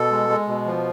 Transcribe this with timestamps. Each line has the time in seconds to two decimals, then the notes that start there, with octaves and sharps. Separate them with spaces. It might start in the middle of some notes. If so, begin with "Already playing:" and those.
Already playing: B2 A4
0.11 G#3
0.29 G#3
0.48 B2
0.66 F3